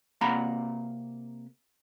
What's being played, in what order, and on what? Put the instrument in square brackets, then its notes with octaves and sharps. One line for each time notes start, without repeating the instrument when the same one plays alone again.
[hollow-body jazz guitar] C3 A#3 F#5 A#5 B5